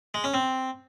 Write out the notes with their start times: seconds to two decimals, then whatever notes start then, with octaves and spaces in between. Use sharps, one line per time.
0.14 G#3
0.24 C#4
0.34 C4